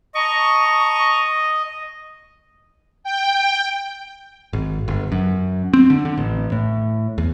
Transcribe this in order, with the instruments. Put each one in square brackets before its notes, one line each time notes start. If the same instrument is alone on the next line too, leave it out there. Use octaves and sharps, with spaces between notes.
[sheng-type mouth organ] D#5 [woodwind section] A5 A#5 C#6
[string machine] G5
[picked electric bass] G#1
G1
F#2
C4
D3
D3
A1
A2
E2